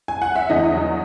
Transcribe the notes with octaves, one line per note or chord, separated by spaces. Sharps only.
G#5
F#5
E5
E2 D#4 D#5
F#3